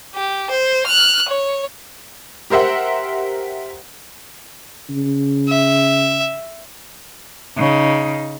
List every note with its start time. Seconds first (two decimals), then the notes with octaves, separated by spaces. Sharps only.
0.15 G4
0.50 C5
0.87 F6 F#6
1.29 C#5
2.50 G4 A#4 C5 E5 F#5
4.89 C#3
5.49 E5
7.57 C#3 D#4